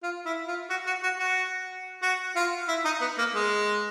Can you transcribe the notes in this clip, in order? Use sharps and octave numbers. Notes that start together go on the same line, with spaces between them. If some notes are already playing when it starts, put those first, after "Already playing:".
F4
E4
F4
F#4
F#4
F#4
F#4
F#4
F4
E4
D#4
B3
A#3
G#3